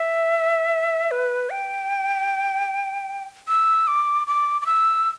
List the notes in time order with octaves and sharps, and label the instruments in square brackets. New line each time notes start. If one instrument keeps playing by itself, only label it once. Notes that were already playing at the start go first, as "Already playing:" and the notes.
Already playing: [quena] E5
B4
G5
E6
D6
D6
D6
E6